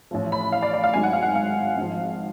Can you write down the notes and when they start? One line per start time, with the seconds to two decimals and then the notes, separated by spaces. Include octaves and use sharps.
0.11 A1 A2 F3
0.32 B5
0.52 F5
0.63 D5
0.74 D5
0.84 F5
0.94 G#1 G#2 F#3 G#5
1.03 F#5
1.13 F5
1.22 F#5
1.35 F5
1.77 G#1 G#2 F3